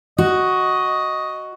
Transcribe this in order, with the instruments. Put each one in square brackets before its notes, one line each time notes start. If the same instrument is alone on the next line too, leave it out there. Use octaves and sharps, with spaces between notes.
[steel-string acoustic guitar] F#4 [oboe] D#5